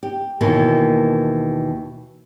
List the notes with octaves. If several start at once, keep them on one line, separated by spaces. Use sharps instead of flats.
G4
D#2 B2 E3 A#3